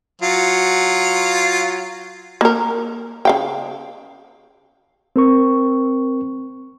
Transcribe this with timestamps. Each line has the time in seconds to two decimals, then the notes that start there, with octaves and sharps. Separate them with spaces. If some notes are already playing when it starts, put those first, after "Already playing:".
0.22 F#3 F4
2.41 A#3 A#4
3.25 C#3 F5 G5
5.16 C4 A#4 C#6